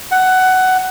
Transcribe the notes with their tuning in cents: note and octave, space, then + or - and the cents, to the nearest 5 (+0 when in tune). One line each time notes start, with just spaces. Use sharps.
F#5 +10